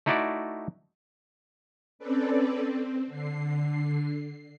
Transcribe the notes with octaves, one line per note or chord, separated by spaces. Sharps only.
A3 D#4 E4 F#4 D5
C4 C#4 A4 B4 D5
C4
D3 C7